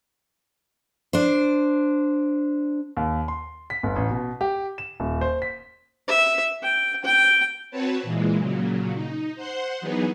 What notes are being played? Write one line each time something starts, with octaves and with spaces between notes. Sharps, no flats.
D4 C5
D#2
C6
B6
G1
A1
B2
G4
E7
D#1
C5
B6
E5
G5
G5
C4 F#4 B4 C#5 A5
A#2 E3 G#3
A#2 C#3 F#3
D#4
C5 F#5 C6
E3 F#3 B3 D#4 G#4